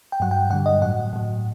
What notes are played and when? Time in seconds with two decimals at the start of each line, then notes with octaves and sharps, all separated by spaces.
0.12 G5
0.20 G2 F#3 F#5
0.31 G5
0.50 G2 D3 G3 F#5
0.66 D#5
0.82 A2 F#3 F#5
1.13 A2 F#3